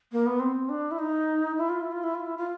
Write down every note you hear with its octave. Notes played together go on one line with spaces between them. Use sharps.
A#3
B3
C4
D4
E4
D#4
E4
F4
E4
F4
E4
F4
E4
F4